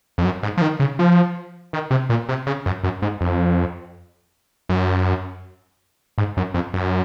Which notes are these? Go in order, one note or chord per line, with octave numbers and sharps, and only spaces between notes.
F2
F#2
G#2
F3
D#3
C#3
F3
D#3
C3
A#2
C3
C#3
F#2
F#2
G#2
F2
F#2
G#2
F#2
F2
F#2